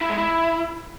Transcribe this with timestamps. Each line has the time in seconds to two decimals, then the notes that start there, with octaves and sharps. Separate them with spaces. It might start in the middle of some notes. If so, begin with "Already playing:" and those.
0.01 E4
0.09 G#3
0.18 E4